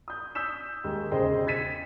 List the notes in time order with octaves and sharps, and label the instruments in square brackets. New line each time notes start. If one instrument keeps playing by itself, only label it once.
[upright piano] D#6 G6
D#6 E6 G6 B6 E7
D#2 G#3 A#3
E1 C#3 G#4 C5 D#5 G5
G#6 A6 B6 D#7